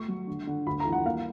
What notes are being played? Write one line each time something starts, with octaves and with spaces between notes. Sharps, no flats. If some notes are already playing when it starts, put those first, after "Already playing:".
Already playing: A3 C#6
F#3
D3
D3
D2 B5
A#5
E3
F#5
A#3 F5